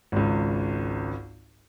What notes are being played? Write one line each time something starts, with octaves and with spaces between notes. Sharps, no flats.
G#1 C#2